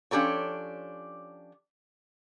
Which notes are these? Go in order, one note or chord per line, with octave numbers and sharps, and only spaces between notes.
F3 C#4 D4 G4 A4 C#5